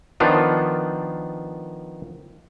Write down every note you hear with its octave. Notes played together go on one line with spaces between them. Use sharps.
D#3 F3 B3 D4 F4